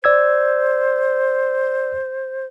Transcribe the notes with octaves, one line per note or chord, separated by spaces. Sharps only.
C5 D5 E6 G#6